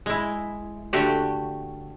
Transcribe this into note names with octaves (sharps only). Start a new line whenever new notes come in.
G#3 E4
D3 A3 F#4 G4